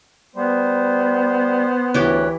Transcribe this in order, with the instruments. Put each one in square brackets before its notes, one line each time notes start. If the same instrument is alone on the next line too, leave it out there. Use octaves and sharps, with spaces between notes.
[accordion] G3 [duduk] B3 [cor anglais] C5
[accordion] D2 C#5 F#6 [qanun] E3 G4